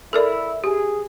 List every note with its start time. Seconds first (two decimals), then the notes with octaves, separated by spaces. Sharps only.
0.13 E4 A4 A#4 D5
0.64 G4 G#4